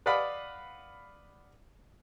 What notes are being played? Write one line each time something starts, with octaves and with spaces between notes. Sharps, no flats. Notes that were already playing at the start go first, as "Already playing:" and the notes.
B4 D5 D#5 F5 F#5 B5